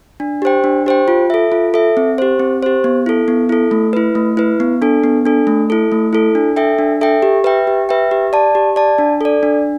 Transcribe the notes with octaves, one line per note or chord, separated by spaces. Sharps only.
D4
G4 C5 G5
D4
G4 C5 G5
F4
A4 E5
F4
A4 E5
C4
G4 C5
C4
G4 C5
B3
E4 A4
B3
E4 A4
A3
E4 B4
A3
E4 B4
B3
D4 A4
B3
D4 A4
A3
E4 A4
A3
E4 A4
D4
A4 E5 G5
D4
A4 E5 G5
G4
B4 E5 G5
G4
B4 E5 G5
G4
D5 A5
G4
D5 A5
D4
A4 D5
D4